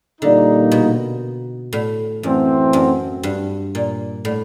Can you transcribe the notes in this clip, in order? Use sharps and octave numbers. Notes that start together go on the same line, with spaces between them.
A#2 D3 G3 A#3 D#4
B2
A2
F#2 E3 A3 C4
F#2
G2
A#2
A2